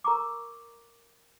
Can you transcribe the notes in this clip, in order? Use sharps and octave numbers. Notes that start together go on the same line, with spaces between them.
A#4 A#5 C#6 D6